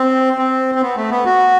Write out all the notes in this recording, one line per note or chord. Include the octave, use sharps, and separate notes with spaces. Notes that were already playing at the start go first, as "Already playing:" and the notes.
Already playing: C4
C4
C4
B3
A3
B3
F#4